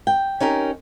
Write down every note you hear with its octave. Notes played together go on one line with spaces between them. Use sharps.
G5
C#4 D#4 G4 A#4